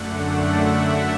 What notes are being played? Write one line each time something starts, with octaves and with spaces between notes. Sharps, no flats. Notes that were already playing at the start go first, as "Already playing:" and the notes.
Already playing: F#2 D3 A3 D4 F#5
F#5
E5